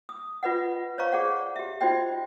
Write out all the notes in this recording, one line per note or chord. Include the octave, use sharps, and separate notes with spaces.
D#6
F4 B4 D#5 F#5
C5 C#5 D#5 F5 A#5 C#6
G#4 D5 F#5
G4 E5
D#4 F4 F#4 C5 D#5 G5